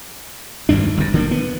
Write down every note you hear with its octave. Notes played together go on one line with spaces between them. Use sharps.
G#1 D2 G2 D4
G1 F#2
D3 D#3 A#3
B3